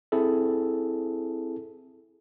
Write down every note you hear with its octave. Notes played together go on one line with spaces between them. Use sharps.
C4 E4 G#4 A4